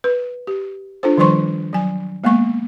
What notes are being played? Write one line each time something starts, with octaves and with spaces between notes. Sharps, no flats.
B4
G4
D4 F4 A4 C5
D#3 F3 G3 C5 C6 C#6
F#3 G#5
G#3 A#3 B3 C#6